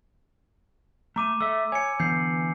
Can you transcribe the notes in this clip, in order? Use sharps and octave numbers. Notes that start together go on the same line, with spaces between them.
A3 A#5 D6 D#7
A3 E5 E6
C#5 G#5 C#7
D3 E3 B3 G6 C7